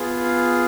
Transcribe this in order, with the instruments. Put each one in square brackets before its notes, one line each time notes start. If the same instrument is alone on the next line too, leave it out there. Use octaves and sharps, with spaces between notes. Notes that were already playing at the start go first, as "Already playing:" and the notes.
Already playing: [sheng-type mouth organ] B3 F4 G#4
F5